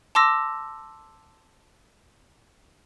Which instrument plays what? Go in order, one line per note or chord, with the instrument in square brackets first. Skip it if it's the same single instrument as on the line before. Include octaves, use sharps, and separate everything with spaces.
[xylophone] A5 C6 D6 E6 A#6